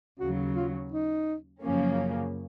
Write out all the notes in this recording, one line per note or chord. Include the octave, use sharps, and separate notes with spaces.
D#2 C#3 F#3 F#4
F4
D#4
F#2 C#3 F3 A#3 C#4